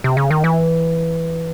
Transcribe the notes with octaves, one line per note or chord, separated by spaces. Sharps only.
C3
C#3
D#3
E3